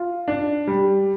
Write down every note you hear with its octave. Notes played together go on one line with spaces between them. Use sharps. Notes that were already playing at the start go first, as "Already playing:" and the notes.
Already playing: F4
D4
G3